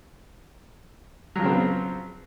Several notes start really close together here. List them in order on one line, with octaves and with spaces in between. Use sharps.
F#3 F3 C#3 C4 B3